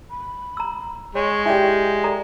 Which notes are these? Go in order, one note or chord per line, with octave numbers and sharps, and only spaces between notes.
B5
A#5 E6
G#3 C#5 C#6
E4 G4 D5 G5 G#5
A4 D5 A#5